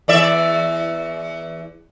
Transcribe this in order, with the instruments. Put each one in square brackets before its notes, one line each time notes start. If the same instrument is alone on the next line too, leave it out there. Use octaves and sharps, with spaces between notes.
[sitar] E2 D5 E5